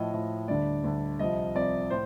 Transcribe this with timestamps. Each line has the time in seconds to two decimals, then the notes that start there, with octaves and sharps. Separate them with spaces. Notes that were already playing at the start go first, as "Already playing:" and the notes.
Already playing: A2 F3 D#5
0.14 A2 F3
0.48 D2 D3 G3 D5
0.84 D2 D3 G3
1.19 C2 C3 F3 D#5
1.55 C2 C3 F3 D5
1.90 A2 C5